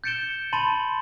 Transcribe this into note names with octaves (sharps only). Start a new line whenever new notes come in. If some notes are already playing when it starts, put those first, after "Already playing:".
G6 A6 C#7 D7 E7 G7
A5 B5 C6 A6 D#7 F#7